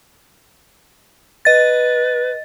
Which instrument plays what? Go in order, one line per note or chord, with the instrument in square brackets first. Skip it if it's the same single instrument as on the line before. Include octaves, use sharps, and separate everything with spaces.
[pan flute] B4 [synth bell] D#5 A6